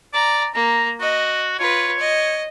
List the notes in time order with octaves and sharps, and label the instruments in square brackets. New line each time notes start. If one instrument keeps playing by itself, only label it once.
[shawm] D5 [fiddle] A#5
[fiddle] A#3 [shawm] A#5
[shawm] F#4 [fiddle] D#5
[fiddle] F4 B4 [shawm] C#5
[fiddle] D#5